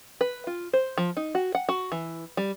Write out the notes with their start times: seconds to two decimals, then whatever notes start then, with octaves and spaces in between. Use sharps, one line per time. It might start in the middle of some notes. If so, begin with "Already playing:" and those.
0.21 B4
0.47 F4
0.73 C5
0.98 F3
1.17 D#4
1.35 F#4
1.55 F#5
1.69 F#4
1.92 E3
2.37 G3